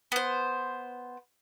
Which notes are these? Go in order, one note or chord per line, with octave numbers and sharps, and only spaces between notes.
B3 C5